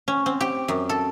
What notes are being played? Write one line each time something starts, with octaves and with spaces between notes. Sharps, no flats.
C#4
C4
G4
F#2
A4